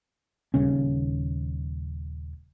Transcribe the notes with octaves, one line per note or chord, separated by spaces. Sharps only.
D#1 D#2 C#3 C#4